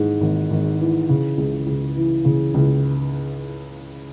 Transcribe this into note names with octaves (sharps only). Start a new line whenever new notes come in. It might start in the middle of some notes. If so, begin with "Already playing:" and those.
Already playing: G#1 G#2 E3
G#1
G#1
E3
C#3
C#2
C#2
E3
C#3
C#2